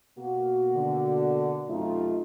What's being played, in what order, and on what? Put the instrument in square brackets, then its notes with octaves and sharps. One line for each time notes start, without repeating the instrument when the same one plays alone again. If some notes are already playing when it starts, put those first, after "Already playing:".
[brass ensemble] B2 A#3 F#4
[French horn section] D3
[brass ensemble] F#2 C3 D#4 [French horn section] A3 C4 F4